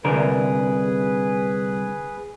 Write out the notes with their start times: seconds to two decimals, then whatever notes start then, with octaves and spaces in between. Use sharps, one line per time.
0.04 C2 D3 G#4 A#4 B4